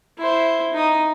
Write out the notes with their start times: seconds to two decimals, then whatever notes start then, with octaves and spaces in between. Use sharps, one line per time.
0.18 E4 C5
0.73 D#4 D#6